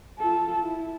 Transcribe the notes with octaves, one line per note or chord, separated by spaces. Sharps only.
F4 A4
E4